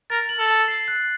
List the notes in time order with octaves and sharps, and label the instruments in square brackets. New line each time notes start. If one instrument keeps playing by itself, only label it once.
[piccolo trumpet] A#4 [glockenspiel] A6
[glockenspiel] F#7
[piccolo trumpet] A4
[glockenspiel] A6
C7
F#6